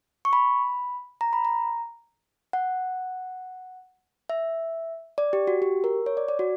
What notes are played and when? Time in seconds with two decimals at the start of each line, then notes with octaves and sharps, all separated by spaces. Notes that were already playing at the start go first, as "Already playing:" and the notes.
0.25 C#6
0.33 B5
1.21 A#5
1.33 B5
1.45 A#5
2.53 F#5
4.29 E5
5.18 D5
5.33 G4
5.47 F#4
5.62 G4
5.84 A#4
6.06 C#5
6.17 D5
6.28 D5
6.39 F#4